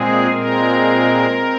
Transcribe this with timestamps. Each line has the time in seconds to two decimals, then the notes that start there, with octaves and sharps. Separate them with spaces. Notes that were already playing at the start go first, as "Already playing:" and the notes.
Already playing: A#2 G#3 C4 G#4
0.32 A#2 G#3 C4 A#4
1.29 C4